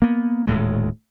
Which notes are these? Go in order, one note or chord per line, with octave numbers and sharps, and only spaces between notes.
A#3 B3
D#1 D2 A2 G#3